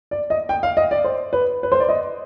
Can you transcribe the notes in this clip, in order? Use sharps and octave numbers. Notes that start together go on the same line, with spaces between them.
D5
D#5
G5
F5
D#5
D5
C5
B4
B4
C5
D5
D#5